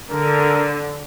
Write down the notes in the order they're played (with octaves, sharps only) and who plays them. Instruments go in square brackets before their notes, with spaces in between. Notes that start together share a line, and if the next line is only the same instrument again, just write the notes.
[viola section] D3 [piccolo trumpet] A#4